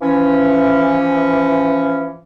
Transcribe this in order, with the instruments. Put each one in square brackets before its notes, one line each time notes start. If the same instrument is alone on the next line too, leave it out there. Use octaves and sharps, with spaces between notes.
[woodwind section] E3 F3 C#4